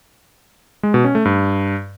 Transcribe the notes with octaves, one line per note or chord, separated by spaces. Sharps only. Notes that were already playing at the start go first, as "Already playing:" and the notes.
G#3
B2
C#4
A3
G2